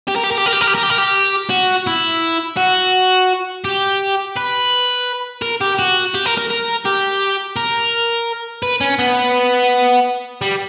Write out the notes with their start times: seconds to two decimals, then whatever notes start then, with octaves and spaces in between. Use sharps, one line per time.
0.08 G4
0.16 A#4
0.23 G4
0.31 A#4
0.37 G4
0.46 A#4
0.53 G4
0.61 A#4
0.67 G4
0.75 A#4
0.83 G4
0.90 A#4
0.98 G4
1.50 F#4
1.87 E4
2.57 F#4
3.65 G4
4.36 B4
5.42 A#4
5.61 G4
5.79 F#4
6.14 G4
6.25 A#4
6.37 A#4
6.50 A#4
6.86 G4
7.56 A#4
8.63 B4
8.81 C#4
8.99 B3
10.42 G3